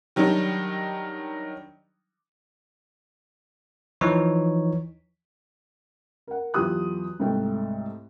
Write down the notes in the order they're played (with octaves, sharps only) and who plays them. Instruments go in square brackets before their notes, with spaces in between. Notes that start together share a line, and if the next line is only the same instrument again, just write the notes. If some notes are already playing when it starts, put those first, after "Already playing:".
[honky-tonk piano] D#3 F#3 G3 D4 D#4
[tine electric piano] E3 F3 D#4 C#5
[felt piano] A#4 F#5
E2 F#3 F4 G4 D#6 F#6
C2 G#2 A3 A4 G5